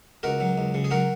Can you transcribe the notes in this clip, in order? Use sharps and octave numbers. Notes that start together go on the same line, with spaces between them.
C#2 F#4 A#4
F#3
C#2
C#3
G#4
F#3 F#4 A#4